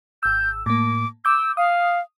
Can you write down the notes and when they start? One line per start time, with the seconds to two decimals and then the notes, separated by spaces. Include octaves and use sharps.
0.23 G#1 E6 G6
0.66 A2 A#3 D6
1.25 D6 E6 G6
1.57 F5 D#6